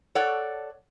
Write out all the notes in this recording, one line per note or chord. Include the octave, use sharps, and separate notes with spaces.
A4 C#5 D5 F#5